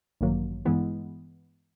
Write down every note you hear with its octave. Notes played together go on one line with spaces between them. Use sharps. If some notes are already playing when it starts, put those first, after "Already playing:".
A1 G2 D#3 F#3 A#3
G2 E3 G#3 B3 E4